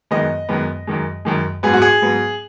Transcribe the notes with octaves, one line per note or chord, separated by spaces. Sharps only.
F#2 D#3 G#3 B3 D#5
F#2 D#3 G#3 B3
F#2 D#3 G#3
F#2 D#3 G#3
G#2 F#3 B3 G#4
F#4
G#4
G#2 F#3 B3